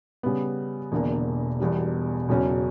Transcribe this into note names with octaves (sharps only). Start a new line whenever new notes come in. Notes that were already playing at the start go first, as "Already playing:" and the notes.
C#3 G3 B3
E1 E2 D3 A#3
E1 E2 B2 G3
E1 E2 C#3 F#3 C#4